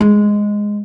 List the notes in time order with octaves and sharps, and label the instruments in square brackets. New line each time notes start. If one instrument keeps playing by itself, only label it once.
[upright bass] G#3